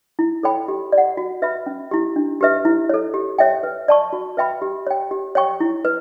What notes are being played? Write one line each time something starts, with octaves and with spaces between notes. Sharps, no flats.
E4
A4 C#5 G5 B5
G4
D5
F#5
F#4
B4 E5 B5
C#4
E4 G4
D4
G4 B4 E5
E4
A4 C#5
G4
C#5 E5 G5
B4
D5 A5 C#6
F#4
B4 E5 G5 B5
G4
C#5 G5
G4
C#5 G5 C#6
E4
B4